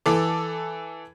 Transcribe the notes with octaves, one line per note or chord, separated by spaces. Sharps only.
E3 A4 D6